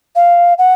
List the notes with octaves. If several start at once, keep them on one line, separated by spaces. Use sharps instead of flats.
F5
F#5